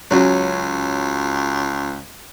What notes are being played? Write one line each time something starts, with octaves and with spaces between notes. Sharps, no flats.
C#2 F#3 C#4